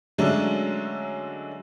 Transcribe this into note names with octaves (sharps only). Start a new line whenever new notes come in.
D3 F#3 G#3 A3 C#4 D4